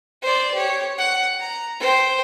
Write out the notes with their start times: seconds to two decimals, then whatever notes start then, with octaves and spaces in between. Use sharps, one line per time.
0.22 C5 D5
0.54 G4 C#5
0.98 F#5
1.40 A#5
1.80 C5 G5